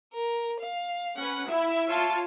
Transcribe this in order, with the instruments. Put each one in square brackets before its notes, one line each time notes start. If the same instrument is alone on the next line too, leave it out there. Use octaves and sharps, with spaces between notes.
[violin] A#4
F5
[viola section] C#4 B4 [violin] F#5
[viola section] E4 [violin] E5
[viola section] F4 C#5 A5